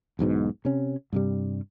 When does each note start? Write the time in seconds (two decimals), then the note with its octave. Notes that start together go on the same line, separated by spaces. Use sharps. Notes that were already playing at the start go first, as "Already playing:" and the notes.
0.19 E1 B1 G#2 B2
0.65 C3 C#4
1.13 G2 C3 G3